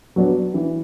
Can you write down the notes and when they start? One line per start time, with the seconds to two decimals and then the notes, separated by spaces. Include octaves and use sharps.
0.16 F#3 B3 D4
0.54 E3